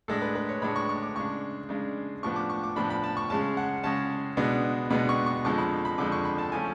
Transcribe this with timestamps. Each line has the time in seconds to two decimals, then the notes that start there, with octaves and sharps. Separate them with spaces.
0.08 A2 G#3 D4 A4
0.22 B4
0.35 B4
0.49 C#5
0.62 A2 G#3 D4 B5
0.76 C#6
0.89 C#6
1.03 D6
1.16 C#3 G#3 D4 C#6
1.69 C#3 G#3 D4
2.23 A2 F3 B3 D4 C#6
2.36 D6
2.50 C#6
2.63 D6
2.76 A2 F3 B3 D4 B5
2.90 B5
3.03 A5
3.17 C#6
3.30 C#3 G#3 C#4 A5
3.57 F#5
3.84 C#3 G#3 C#4 A5
4.37 B2 G#3 B3 D4
4.90 B2 G#3 B3 D4 B5
5.09 C#6
5.26 C#6
5.45 F2 D3 F3 G#3 C#6
5.58 B5
5.85 B5
5.98 F2 D3 F3 G#3 D6
6.12 C#6
6.25 B5
6.38 A5
6.52 F3 A3 C#4 G#5